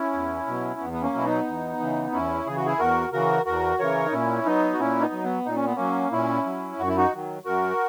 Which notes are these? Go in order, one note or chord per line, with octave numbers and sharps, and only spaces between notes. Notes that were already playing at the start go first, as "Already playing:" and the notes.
Already playing: C#4 E4
E2
B2 F#3
E2 B3
B3
A#3 C#4
B2 F#3 E4
B3 D#4
E2
C#3 E3
E2 C#4 E4
C#3 E3 G#4
F#4
E4 G#4
E2 F#4 A#4
C#3 E3 F#4 A#4
E2 F#4 A#4
C#3 E3 A#4 C#5
D#4
A#2 C#4 E4
F#3 B3 D#4
F#4
A#2 C#4 E4
B3 D#4
F#3
B3
A#2 D#4
C#4
B3
F#3 A#3 C#4
A#2 C#4 E4
F#3
F#2 F#4
E4
D#4 F#4
D#3 F#3
F#2 F#4 A#4